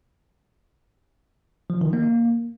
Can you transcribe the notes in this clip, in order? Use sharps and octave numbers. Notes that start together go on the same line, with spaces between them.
F3
D#3
A#3